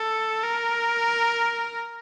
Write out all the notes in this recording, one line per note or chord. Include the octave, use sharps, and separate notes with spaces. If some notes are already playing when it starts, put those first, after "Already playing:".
Already playing: A4
A#4